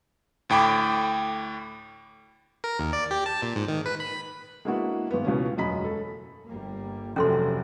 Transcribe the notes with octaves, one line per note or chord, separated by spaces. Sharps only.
D2 A2 G5 B5 D6
A#4
D#2
D5
G4
A5
A#2
G#2
D#3
B4
B5
G#3 A#3 B3 D4 E4 F#4
G#1 B3
C#2 B2 E3 C#4
E1 F#2 D#5 A#5 B5 B6
A4
G1 G3 A#3
F1 C3 F#3 C#4 A4 C6